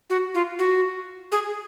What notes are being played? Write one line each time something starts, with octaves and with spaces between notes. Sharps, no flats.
F#4
F4
F#4
G#4